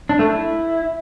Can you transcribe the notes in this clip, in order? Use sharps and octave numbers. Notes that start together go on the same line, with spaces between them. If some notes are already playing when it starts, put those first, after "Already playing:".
D4
A3
E4